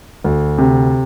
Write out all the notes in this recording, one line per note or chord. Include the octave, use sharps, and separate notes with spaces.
D2
C3